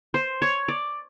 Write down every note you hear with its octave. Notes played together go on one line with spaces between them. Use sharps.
C5
C#5
D5